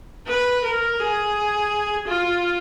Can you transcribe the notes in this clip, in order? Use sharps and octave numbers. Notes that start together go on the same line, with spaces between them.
B4
A#4
G#4
F4